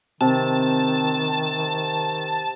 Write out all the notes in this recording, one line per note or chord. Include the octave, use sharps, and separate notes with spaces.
C3 D#3 A5